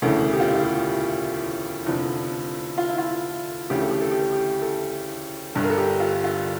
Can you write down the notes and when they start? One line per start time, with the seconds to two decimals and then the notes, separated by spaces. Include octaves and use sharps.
0.02 E1 D2 C#3 E3 A4
0.33 G4
0.40 F4
0.48 E4
0.55 F4
0.64 G4
1.86 F1 E2 D3 F3
2.78 F4
2.89 E4
2.98 F4
3.70 D2 C#3 E3 G4
3.81 A4
3.91 G4
4.01 A4
4.11 G4
4.22 A4
4.32 G4
4.62 A4
5.55 G1 G2 D3
5.64 A#4
5.70 A4
5.77 G4
6.00 F4
6.24 F4